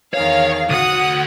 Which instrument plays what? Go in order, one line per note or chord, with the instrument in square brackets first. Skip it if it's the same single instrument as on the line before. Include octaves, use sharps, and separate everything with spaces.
[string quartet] E2 D#3 G#4 [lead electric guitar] C#5 [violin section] F5
[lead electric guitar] D2 F#5 [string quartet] F#4 F#6 [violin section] D#6